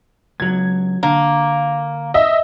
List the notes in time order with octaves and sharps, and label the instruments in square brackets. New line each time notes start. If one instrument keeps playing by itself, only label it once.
[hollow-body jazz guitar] C#2 F#3 [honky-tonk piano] G#6
[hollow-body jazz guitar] D3 [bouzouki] A#3
[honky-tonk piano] D#5 E5